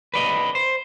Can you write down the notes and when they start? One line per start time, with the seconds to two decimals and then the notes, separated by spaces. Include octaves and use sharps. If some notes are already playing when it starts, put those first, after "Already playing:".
0.14 B4 D5 D#5
0.55 C5